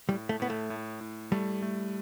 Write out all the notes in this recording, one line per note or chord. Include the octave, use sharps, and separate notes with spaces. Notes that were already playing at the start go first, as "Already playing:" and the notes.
A2 G3
A3
A2 B3
A3
A2
A2
G3 A3
A3